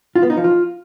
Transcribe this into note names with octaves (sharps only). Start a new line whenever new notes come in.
F4
B3
D#4
F3
F4